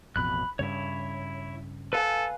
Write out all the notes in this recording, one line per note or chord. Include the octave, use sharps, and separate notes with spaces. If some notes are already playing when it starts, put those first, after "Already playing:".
A1 F2 B2 B5 F#6
G2 C#3 E4 C#5
A4 B4 F5 G#5